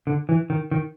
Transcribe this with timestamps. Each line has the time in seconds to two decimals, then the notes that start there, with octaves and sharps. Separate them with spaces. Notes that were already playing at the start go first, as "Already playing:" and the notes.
0.07 D3
0.29 E3
0.50 D#3
0.71 D#3